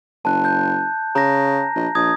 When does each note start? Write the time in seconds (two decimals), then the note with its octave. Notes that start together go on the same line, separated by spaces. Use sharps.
0.25 F#1 A5 F#6
0.45 G6
1.15 C#3 A#5 A#6
1.76 A#1
1.95 A#1 D#6 G#6